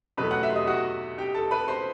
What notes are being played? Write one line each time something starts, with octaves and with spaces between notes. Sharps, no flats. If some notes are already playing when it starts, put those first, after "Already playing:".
E2 B2 F#3 A3 B4 B5
F#5 F#6
E5 E6
C6
D#5 D#6
F#4 F#5
G4 G5
A4 A5
B4 B5
C5 C6